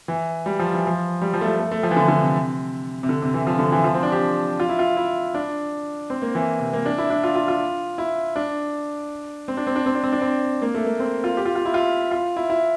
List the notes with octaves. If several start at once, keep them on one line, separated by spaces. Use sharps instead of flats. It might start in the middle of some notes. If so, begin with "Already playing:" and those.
E3
G3
F3
E3
F3
G3
F3
A3
G3
A3
A3
F3
E3
D3
D3
C3
C3
D3
C3
E3
F3
D3
E3
F3
C4
D4
G4
F4
E4
F4
E4
D4
C4
A#3
E3
C3
A#3
D4
E4
D4
F4
F4
F4
E4
D4
C4
D4
C4
D4
C4
D4
C4
D4
C4
A#3
A3
A#3
C4
F4
G4
F4
F4
E4
F4
F4
E4
E4